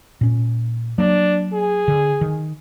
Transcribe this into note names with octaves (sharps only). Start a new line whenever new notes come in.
A#2 C#4
F#3 A#3 D4
G#4
D3
D#3